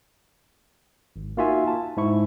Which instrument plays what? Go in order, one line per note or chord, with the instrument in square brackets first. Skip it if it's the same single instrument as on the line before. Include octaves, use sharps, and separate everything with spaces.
[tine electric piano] G#1
A#3 D#4 F4 F#4 E5 G#5
A5
G#2 E4 C#6